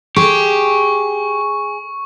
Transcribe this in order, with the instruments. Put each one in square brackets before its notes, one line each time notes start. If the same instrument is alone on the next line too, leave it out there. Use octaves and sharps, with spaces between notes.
[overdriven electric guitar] G4 [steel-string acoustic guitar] G#4 [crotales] C#6